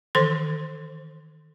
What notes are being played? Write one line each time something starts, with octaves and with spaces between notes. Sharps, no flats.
D#3 E3 A4 C5 C6